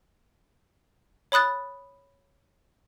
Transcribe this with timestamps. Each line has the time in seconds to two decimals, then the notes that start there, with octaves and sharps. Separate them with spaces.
1.32 C#5 B5 D#6 F#6 A6